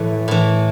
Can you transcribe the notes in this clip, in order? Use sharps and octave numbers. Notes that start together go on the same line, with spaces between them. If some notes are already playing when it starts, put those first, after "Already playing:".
Already playing: A2 E3 A3
A2 E3